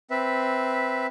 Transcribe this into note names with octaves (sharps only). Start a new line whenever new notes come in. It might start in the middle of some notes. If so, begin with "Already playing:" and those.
C4 B4 E5